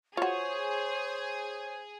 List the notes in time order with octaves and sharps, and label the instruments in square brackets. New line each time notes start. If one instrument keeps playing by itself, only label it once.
[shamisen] F4 F#4 [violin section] G#4 [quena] C5 [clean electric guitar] C#5